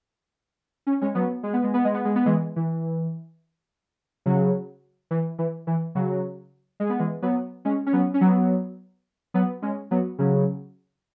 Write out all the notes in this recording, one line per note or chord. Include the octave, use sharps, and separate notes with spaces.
C#4
G#3 C#4
F#3 B3
G#3
B3
G#3
B3
G#3
B3
G#3
B3
E3 G#3
E3
C#3 F#3
E3
E3
E3
C#3 F#3
G#3
B3
E3 G#3
F#3 B3
G#3 C#4
C#4
F#3 B3
C#4
F#3 B3
F#3 B3
G#3 C#4
F#3 B3
C#3 F#3